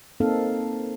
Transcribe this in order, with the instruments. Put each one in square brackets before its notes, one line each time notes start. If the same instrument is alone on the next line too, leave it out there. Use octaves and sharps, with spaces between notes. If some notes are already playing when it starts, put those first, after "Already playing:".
[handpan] A#3 C4 D#4 A4 F5